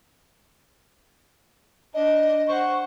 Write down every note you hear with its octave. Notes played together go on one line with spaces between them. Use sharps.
D4 D#5
C5 F#5 C#6